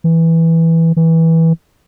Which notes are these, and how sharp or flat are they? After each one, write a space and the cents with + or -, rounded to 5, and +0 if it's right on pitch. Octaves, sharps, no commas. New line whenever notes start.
E3 -5
E3 -15